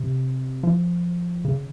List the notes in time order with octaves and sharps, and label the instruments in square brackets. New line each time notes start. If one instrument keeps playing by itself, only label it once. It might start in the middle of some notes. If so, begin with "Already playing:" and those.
Already playing: [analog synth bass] C3
F3
C#3